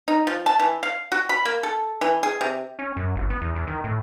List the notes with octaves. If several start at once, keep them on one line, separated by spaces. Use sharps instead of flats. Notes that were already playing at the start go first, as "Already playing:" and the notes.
D#4
F3
A5
E3
F5
F#4
B5
A#3
A4
E3
G#4
C3
C#4
F#2
G1
B3
E2
E2
D#3
A2